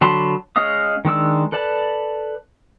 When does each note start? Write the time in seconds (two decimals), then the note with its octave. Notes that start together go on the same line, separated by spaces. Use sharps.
0.01 D3 F#3 A5 B5 C6
0.56 G#3 C#4 D#5 F5 D#6
1.05 D#3 G#3 D4 E6
1.52 A4 B4 D5 A5